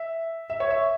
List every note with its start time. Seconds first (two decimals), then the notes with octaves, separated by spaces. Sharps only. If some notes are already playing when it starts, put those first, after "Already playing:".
Already playing: E5
0.50 E5
0.60 C#5
0.70 E5